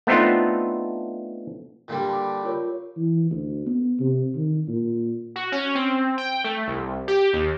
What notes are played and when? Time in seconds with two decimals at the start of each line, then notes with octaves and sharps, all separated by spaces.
0.07 A3 B3 C4 D4 D#4 F4
1.88 A#2 D3 G3
2.09 A5 B5 D6
2.45 F4 A#4 C#5
2.97 E3
3.31 D2
3.66 B3
4.00 C3
4.36 D#3
4.68 A#2
5.36 F#4
5.52 C#4
5.75 C4
6.18 G5
6.44 A3
6.68 C2
7.08 G4
7.33 D#2